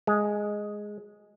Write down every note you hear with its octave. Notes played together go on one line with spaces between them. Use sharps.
G#3